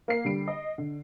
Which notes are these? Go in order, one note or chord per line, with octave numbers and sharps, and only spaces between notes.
A#3 A#4 C7
D3 G3 D7
D#5
D3